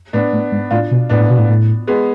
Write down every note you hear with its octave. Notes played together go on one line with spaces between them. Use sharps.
A2 B3 D4
A2
G#2
A2 D4 F4
B2
A2 B3 D4
A2
B2
A2
A2
G#3 B3